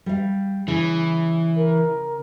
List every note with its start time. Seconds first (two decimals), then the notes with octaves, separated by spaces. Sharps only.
0.06 G3 F5
0.68 C#3 E3
1.56 A#4